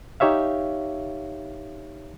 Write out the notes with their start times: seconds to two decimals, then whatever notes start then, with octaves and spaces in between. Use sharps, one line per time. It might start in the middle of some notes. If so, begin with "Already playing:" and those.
0.20 D#4 G4 C#5 E5 F5